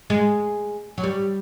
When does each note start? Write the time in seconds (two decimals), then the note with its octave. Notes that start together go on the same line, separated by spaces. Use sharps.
0.10 G#3
0.98 F#3
1.04 G3